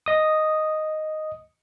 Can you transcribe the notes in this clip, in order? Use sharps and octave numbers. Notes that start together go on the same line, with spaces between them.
D#5 D#6